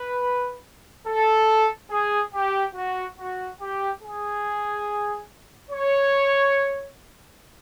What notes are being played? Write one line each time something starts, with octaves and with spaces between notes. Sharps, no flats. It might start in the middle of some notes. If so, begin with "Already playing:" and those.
Already playing: B4
A4
G#4
G4
F#4
F#4
G4
G#4
C#5